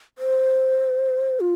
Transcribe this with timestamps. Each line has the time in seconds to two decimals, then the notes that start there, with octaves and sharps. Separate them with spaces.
0.18 C5
1.40 F4